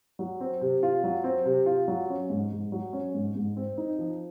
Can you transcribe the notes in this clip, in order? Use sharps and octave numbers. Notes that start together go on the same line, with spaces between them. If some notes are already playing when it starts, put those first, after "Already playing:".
F#3
C4
C3
F4
F#3
C4
C3
F4
F#3
C#4
G#2
G#2
F#3
C#4
G#2
G#2
C4
D#4
F3